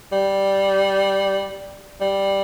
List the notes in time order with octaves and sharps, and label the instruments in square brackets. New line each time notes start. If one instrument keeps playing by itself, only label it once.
[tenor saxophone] G3
G3